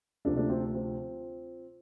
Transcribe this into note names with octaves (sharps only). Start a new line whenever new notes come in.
D2 C3 F3 A3 D4
A3 D4
C4 F4
C4 F4